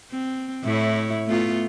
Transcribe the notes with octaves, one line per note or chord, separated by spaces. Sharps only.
C4
A2 E4 C#5
A3 B3 F4